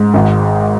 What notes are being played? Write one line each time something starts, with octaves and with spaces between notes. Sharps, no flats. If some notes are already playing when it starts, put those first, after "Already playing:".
Already playing: G#2
G#1